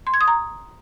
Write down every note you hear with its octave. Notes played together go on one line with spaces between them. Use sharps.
C6
G#6
D#6
A#5